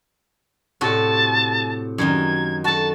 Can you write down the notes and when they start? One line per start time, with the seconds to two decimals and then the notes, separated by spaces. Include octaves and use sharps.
0.81 A2 C3 F#4 A5
1.98 F#2 D#3 D#4 G#6
2.64 F#4 A4 A5